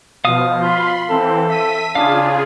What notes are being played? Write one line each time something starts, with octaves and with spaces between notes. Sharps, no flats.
B2 F3 F5 D#6
F4 B5 C6
E3 C4 A4
E5 B6 D#7
C#3 D4 F4 G#4 F5